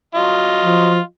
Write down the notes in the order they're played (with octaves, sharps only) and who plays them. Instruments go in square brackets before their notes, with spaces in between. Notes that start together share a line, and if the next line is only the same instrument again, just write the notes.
[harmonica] F#3 F4 D#5
[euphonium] F3